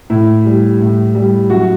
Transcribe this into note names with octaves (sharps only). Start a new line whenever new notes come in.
A2 E4
G3
A2
G3
F#2 F#4